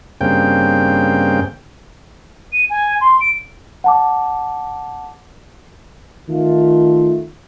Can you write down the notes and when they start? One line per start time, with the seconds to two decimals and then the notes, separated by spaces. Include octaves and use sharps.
0.21 G2 C#3 A#3 C4 G5
2.53 D#7
2.70 G#5
3.01 C6
3.21 D7
3.84 F#5 A5 D6
6.29 D#3 A3 F4